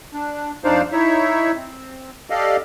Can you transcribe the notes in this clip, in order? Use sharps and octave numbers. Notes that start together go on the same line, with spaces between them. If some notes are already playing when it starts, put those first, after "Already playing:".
D4
F2 D4 D#4 C5 D5 F5
D#4 E4 C#5 E5
C4
G4 A4 D5 D#5 F5